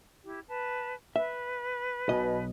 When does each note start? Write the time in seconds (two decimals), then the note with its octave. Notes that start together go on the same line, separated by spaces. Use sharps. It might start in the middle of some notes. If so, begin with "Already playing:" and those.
0.25 E4 G4
0.49 B4 A5
1.16 B4 E5
2.09 B1 B2 D#5